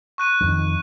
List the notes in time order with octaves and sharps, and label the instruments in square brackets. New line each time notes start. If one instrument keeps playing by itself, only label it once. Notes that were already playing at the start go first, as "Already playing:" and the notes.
[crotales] C#6 F#6 D#7
[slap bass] F2 D#3